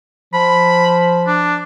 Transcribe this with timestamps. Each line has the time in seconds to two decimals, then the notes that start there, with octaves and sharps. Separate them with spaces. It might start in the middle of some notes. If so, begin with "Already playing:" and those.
0.33 F3 B5
1.26 D4